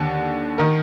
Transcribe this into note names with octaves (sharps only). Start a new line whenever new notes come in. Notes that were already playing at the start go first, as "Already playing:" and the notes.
Already playing: D#2 D3
D#3 A#4